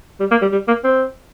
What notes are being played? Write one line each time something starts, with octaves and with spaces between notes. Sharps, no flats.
G3
A#3
G3
G3
A#3
C4